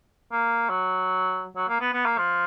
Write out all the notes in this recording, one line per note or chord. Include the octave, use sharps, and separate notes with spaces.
A#3
F#3
F#3
A#3
B3
B3
A#3
F3